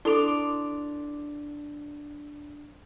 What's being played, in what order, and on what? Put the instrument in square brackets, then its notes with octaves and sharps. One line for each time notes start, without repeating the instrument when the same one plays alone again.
[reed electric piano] D4 [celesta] E4 A4 F7 [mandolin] C6 D6